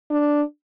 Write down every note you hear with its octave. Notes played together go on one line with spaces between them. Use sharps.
D4